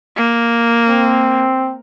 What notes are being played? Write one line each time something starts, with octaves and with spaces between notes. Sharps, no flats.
A#3
C4